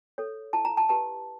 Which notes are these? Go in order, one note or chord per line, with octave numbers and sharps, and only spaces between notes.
A4 C#5
E4 A5
A#5
A5
G4 B4 A5